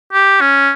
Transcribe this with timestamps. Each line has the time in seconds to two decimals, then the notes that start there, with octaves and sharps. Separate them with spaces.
0.13 G4
0.41 C#4